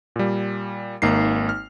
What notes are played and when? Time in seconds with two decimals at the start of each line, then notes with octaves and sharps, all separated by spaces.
0.16 A#2 G3
1.02 G#1 A#3 D#4 C7
1.49 F6